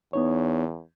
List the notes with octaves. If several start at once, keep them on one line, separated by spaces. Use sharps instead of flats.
E2 B3 D#4 C#5